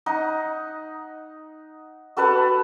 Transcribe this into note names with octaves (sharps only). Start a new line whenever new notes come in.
D#4 F#5
F#4 A4 B4 F#5